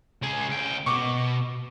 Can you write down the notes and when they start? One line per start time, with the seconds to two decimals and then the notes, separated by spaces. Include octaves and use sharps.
0.22 C#2 G#4
0.49 C#2 G5
0.86 B2 C#6 D6